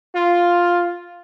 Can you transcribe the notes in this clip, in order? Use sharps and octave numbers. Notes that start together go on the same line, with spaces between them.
F4